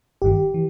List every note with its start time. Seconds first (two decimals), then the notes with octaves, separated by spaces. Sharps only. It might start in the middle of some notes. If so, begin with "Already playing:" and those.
0.22 G1 G2 D#3 G4
0.54 E3